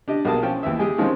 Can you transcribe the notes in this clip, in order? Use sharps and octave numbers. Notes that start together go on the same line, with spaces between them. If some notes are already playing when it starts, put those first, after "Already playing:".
D4 G4 D#5
B1 A#3 G#4 A5
F3 C#4 G5
D#2 E3 E5
G#3 G4 G#4
D#3 F3 G#3 C4 C#4 D#4